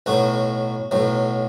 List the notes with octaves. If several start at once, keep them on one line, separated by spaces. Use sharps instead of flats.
B1 A2 F#3 F#4
B1 A2 F#3